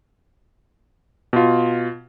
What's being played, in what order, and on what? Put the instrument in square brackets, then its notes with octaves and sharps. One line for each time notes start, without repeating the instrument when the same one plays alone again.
[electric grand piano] B2 F4